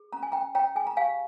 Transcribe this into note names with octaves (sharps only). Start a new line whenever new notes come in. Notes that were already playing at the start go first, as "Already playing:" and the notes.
Already playing: G#4
C#4 A#5
G#5
C#4 G5 A#5
C#5 G5 A#5
G#4 G#5
A#5
G4 F5 G#5